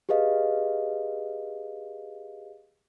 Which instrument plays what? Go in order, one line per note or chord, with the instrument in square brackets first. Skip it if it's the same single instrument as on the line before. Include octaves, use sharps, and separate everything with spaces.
[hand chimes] G4 G#4 B4 D#5 F5